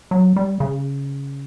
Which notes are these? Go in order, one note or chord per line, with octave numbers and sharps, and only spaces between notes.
F#3
G3
C#3